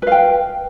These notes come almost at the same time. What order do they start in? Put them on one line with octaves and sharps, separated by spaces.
B4 F5 G5